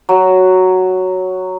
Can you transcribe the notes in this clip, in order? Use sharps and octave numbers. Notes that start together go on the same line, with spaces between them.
F#3